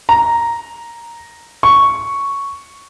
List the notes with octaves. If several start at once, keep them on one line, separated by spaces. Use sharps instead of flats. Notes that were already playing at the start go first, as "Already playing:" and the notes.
A#5
C#6